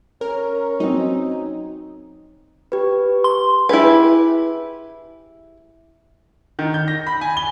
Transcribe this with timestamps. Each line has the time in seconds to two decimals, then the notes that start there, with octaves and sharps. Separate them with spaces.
0.21 C#4 A#4
0.80 F#3 C4 D#4
2.72 G4 B4
3.24 C6
3.69 E4 G4 G#4 B4
6.59 D#3
6.74 G6
6.88 A#6
7.07 B5
7.21 G#5
7.37 G7